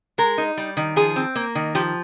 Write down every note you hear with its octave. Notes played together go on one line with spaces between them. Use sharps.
G#3 A#4
D#4
G3
D#3
F3 G#4
C4
A#3
D#3
F3 G4